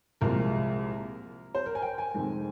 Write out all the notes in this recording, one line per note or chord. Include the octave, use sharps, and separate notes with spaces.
C2 A#2 F3 G#3 A#4
C5
A#4
G#5
G5
G#5
F1 F2 D#3 G#3